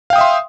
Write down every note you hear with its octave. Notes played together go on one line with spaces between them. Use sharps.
E5 F5 G5 C6 D#6